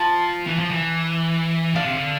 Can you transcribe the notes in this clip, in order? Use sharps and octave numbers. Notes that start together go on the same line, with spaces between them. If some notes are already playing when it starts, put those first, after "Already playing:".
Already playing: F3 A5
E3
F3
E3
D3 F5
C3
D3